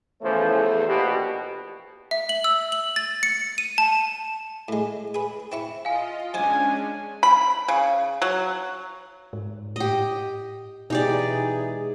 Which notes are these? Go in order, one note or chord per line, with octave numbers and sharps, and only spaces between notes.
E2 C#3 E3 F3 A3 C5
A#1 B2 G4
E5
F#7
E6
F#7
A6
C#7
D#7
A5
A2 G#3
G#4 B4
C4 E4 C#6
F4 D#5 F5 G#5
F3 G#3 C#4 D4 D#5 F5 G#5
B5
C#3
F#3
G#2
A2 G4 D#5
B2 E3 G#3 D#4 G4 G#4 D5